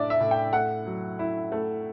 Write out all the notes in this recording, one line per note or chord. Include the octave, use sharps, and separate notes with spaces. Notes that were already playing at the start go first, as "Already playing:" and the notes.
Already playing: A2 D4 D5 E5
E5
A2
G5
A3 F#5
F#3
E4
A3